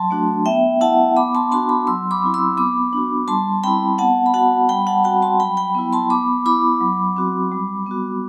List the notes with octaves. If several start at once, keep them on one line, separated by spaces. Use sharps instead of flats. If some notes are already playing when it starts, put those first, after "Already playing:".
Already playing: F#3 A5 C6
A3 D4 F#4
B3 E5 G5
E4 F#5 A5
B3 B5 D6
A5 C6
D4 F#4 A5 C6
B5 D6
F#3 C6 E6
B5 D6
C4 E4
C6 E6
B3 B5 D6
D4 F#4
G3 A5 C6
C4 E4 G5 B5
B3 F#5 A5
B5
F#4 F#5 A5
G3 G5 B5
F#5 A5
C4 F#4 G5 B5
A5 C6
F#3 G5 B5
G5 B5
B3 E4
A5 C6
B3 B5 D6
E4 B5 D6
F#3
C4 F#4
G3
B3 F#4